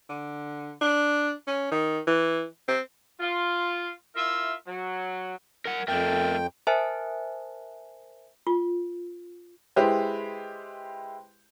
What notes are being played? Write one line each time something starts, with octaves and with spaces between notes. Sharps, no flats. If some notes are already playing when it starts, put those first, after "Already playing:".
D3
D4
C#4
D#3
E3
C4
F4
E4 F4 A#4 E5
F#3
A#4 F#5
F2 A3 A#4 G5
A#4 C5 E5 G#5 A5 F#6
F4
G#3 E4 G4 B4 C5